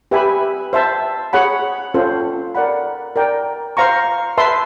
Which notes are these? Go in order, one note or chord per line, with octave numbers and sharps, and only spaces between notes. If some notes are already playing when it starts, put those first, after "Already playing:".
G4 B4 E5 G#5 B5
C5 E5 A5
G#4 C#5 F#5 B5
C#4 F4 A4 C5
A#4 D5 F#5 B5
A#4 D5 G5
C5 F5 A#5 C#6
B4 E5 A5 C6